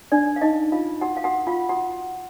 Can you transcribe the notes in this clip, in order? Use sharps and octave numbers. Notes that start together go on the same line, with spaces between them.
D4 D5
F5
D#4 D#5
F4 F5
F#4 F#5
F5
F#4 F#5
F4 F5
F#4 F#5